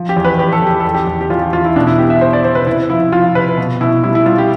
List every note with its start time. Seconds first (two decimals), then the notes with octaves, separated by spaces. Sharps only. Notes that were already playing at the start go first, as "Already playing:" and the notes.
Already playing: F3
0.09 G4
0.16 E2
0.25 B4
0.39 E2 G4
0.52 A4
0.62 E2 G4
0.80 A4
0.85 E2
0.95 G4
1.07 E2
1.21 G4
1.30 E2 F4
1.42 G4
1.53 E2 F4
1.65 E4
1.76 B2 D4
1.87 E4
1.98 B3 G4
2.10 E5
2.21 B3 C5
2.33 D5
2.44 B2 C5
2.55 B4
2.66 C3 E4
2.90 F3 E4
3.12 F3 F4
3.35 C3 B4
3.57 B2
3.81 B2 E4
4.03 G3 E4
4.15 E4
4.26 G3 F4
4.38 G4